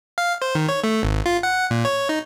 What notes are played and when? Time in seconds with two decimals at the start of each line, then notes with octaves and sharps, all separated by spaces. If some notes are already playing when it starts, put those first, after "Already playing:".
0.18 F5
0.42 C5
0.55 D#3
0.69 C#5
0.84 A3
1.03 G#1
1.26 F4
1.43 F#5
1.71 A#2
1.85 C#5
2.09 D#4